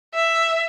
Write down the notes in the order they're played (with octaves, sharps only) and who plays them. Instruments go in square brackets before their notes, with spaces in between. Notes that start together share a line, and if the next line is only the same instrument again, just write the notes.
[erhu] E5